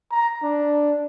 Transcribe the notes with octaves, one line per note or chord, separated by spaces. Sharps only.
A#5
D4